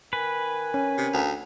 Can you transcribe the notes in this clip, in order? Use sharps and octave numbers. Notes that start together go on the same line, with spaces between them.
D#3 B4 G#5
C#4
C3
D2